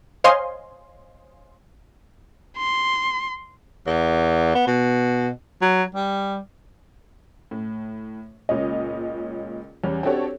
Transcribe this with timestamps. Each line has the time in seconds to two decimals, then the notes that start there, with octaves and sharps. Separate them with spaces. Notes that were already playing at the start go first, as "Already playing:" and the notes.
0.24 C5 C#5 D#5 F5 G#5 C6
2.57 C6
3.87 E2
4.55 B3
4.67 B2
5.61 F#3
5.95 G3
7.51 A2
8.49 C#2 A#2 C#4 D#5
9.84 E2 G3 C#4
10.03 C4 D4 F#4 G4 A4 C#5